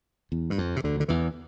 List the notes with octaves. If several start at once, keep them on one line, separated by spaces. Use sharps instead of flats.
E2
G2
F2
C3
D2 D3
D3
E2 E3